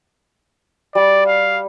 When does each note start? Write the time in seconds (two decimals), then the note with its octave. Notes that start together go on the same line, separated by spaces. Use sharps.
0.95 G3 D5
1.27 F5